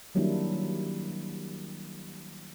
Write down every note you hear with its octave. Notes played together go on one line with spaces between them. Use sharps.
D#3 F#3 G3 A#3 D4 E4